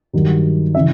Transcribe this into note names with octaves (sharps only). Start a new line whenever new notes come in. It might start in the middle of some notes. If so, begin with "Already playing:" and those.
G2 D#3 F#3
C#3 E3 E5